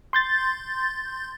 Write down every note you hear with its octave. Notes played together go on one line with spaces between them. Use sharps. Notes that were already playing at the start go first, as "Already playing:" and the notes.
C6 G6 A6